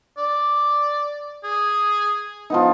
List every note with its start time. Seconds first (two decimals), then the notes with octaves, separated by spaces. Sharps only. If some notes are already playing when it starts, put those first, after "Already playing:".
0.18 D5
1.44 G#4
2.50 F3 B3 D#4